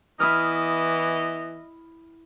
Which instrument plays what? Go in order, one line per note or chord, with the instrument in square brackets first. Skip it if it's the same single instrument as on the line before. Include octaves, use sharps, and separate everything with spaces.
[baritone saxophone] E3 [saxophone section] B3 D#5 E5 [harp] E4 D#6 F6